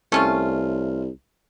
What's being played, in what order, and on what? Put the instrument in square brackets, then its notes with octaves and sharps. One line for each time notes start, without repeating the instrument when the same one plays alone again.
[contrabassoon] C2 [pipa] A3 C#4 F4